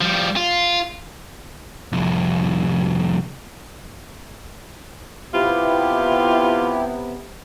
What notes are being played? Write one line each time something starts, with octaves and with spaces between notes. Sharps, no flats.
F3 G3
F4
C2 F2
C3 B3 E4 F4 G4